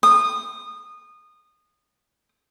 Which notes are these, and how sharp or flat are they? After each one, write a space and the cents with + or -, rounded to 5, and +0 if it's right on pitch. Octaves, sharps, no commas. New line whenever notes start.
D#6 -20